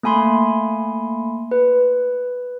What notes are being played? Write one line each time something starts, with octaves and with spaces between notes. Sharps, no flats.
A3 A#3 G#5 B5 C6
B4